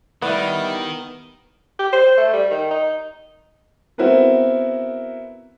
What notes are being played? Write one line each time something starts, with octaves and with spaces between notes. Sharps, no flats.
D#3 G3 B3 E4
G4
C5
A3
G3
D#3
D#4
B3 C4 E4 F#4 A#4 B4